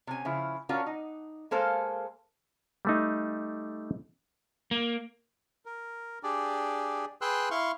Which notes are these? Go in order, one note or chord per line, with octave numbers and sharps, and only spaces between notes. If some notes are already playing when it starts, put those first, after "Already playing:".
C3 C#4 G#5
C#3 F3 E4
C#4 D4 F4 F#4 A#4 C#5
D#4
G#3 A#3 A4 C5 F5
G3 A3 D#4
A#3
A#4
D4 G4 G#4 D5
G#4 B4 G5 C6 E6 F#6
E4 F5 C6 C#6